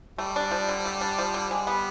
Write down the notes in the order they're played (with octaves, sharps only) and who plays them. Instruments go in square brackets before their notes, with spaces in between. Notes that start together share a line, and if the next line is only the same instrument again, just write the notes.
[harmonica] G3 [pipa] A3
[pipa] D4
F3
D3
A3
D4
F3
D3
[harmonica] G3 [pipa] G#3
[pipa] B3